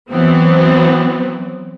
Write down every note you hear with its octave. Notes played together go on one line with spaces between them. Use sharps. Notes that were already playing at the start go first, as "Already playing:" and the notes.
E3 F#3 B3 C4